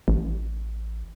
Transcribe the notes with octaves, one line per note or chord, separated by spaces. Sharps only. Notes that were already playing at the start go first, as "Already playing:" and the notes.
A1